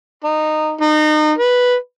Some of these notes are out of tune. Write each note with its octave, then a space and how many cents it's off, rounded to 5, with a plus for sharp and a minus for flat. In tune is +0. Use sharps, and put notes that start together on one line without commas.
D#4 -15
D#4 -30
B4 -5